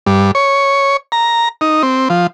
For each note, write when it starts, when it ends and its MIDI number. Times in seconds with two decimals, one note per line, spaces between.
0.06 0.31 43
0.35 0.97 73
1.12 1.49 82
1.61 1.82 63
1.83 2.08 60
2.10 2.27 53